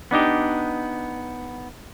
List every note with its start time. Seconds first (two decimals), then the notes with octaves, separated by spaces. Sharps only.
0.11 B3 D4 D#4 G4